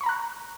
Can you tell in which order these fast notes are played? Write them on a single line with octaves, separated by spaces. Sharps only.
C#6 B5 A#5 F#6